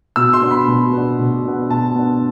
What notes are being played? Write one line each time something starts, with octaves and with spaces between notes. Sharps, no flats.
B2 E6
C6
B3 D4
B5
B2
B3 D4
B2
B3 D4
B2 A5
B3 D4